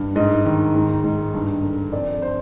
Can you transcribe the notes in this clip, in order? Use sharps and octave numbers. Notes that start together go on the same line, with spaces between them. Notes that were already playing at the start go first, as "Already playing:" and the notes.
Already playing: G2
G#2 D#5
D#3
G#2
G#2
G2
D3
F2 D5
C5